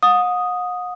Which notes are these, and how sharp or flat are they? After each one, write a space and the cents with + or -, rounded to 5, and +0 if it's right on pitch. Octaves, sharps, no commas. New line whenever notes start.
F#5 -40 D#6 +0